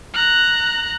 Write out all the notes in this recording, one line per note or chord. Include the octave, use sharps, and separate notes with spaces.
A#5 F#6